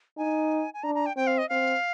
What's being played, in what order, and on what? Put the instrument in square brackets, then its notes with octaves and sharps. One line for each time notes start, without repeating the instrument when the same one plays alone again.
[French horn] D#4 [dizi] G#5
[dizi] G#5
[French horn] D4 [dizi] A#5
[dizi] A#5
G5
[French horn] C4 [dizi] G5
[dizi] F5
D#5
[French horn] C4 [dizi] F5